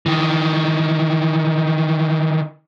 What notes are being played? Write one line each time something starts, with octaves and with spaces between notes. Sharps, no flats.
D#3 E3